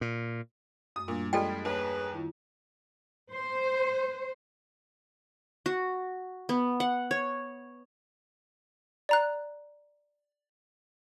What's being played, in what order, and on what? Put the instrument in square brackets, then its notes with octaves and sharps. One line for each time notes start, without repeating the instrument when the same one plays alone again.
[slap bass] A#2
[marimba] F#2 A3 [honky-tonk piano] D#6
[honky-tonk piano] A#2 [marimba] G3 A#3 D4
[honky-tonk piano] F3 G3 G#3 [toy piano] A4 D5 G5 [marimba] C6 F6
[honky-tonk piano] D#2 [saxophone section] G#4 B4 [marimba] C#5 D#5 A5
[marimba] D#3 E4 F4
[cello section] C5
[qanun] F#4
B3
F#5
C#5
[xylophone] D5 A#5 F#6